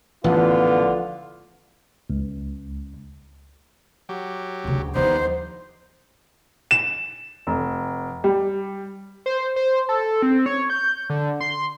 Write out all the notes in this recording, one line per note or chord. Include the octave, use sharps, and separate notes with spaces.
A1 D3 E3 F3 B3 F4
C#2
F#3 G4
D2 C#3
D#2 F3 G3 B3 D#4 C5
E7
F1
G3
C5
C5
A4
C4
C#5
G6
D3
C6